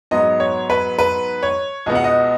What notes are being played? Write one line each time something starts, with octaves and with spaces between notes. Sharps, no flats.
G#2 F#3 B3 D#5
C#5
B4
B4
C#5
C#2 B2 B3 D#5
F#5
D#5